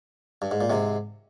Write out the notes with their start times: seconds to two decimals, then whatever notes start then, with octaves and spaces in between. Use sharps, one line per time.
0.42 G2
0.51 G#2
0.61 A#2
0.70 G#2 C3